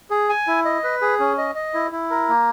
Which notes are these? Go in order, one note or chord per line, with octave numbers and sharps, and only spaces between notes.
G#4
G#5
E4
D#5
B4
G#4
C#4
D#5
D#5
E4
E4
A#4
A#3